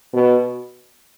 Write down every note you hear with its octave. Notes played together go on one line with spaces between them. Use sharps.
B2